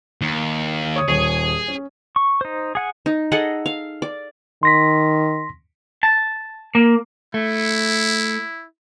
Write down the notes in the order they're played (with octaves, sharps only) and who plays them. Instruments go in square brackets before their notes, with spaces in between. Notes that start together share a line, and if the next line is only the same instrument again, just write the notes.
[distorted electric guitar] D#2
[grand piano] C#5 D#6
[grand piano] D#1 C#5 [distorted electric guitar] G#4
[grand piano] C#4
[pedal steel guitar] C#6
D#4 C5
G#4 F#5 G#5
[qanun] D#4
G#4 A4 D#5 F#5
F5
D5
[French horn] D#3 [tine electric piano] C6 A#6 B6
[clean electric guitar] A5
A#3
[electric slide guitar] A3 [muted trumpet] E4